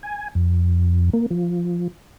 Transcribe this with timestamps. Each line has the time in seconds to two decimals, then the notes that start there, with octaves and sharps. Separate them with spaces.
0.03 G#5
0.35 F2
1.13 A#3
1.31 F3